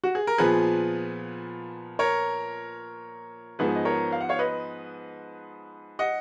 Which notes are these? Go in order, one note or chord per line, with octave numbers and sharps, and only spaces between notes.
F#4
G#4
A#4
A#2 F3 B3 G#4 B4
A#4 C#5
G#2 F3 B3 G#4 B4
D#5
A#4 C#5
F5
F#5
C#5 F5
B4 D#5
D#5 F#5